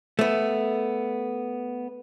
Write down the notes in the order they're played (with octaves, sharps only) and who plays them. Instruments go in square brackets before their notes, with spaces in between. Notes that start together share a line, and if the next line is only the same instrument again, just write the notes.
[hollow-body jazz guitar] A3 B3